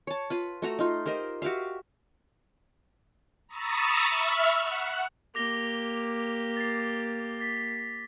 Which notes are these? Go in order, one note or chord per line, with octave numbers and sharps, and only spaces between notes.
C#5 A5
F4 B4 B5
A3 F#4 A#5
D#4 F4
G4 A#4 C5 D#5
F#4 G4 E5 F5
A#5 B5 C#6 D#6 E6 A6
E5 B5 C#6 E6 F6
F#5
A#3 G4 D6 A#6 G7
A6 C7
A6 B6